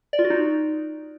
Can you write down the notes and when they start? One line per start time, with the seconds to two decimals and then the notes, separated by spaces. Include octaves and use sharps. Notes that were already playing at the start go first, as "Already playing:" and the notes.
0.13 D5
0.19 F4
0.25 F#4
0.30 D#4